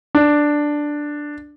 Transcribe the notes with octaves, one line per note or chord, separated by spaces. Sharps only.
D4